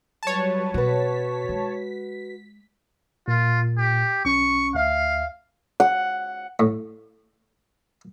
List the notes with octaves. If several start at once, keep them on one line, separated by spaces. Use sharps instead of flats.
F#3 G3 B4 C#5 A5
B2 F#4 B4 B6
G#3
A#2 F4
G4
B1 C#4 C#6
D2 E5 F5
F#5
A2